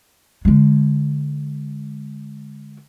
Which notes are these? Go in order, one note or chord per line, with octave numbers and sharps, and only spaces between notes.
D3 G#3